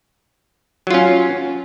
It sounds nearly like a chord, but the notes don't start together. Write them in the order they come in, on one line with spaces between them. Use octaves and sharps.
F#3 F4 C#4